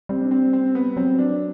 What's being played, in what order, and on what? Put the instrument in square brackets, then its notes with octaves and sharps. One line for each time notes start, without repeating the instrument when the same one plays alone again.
[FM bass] G3 [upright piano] C4
[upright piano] D4
C4
C4
B3
[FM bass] F#3 [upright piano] C4
[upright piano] D4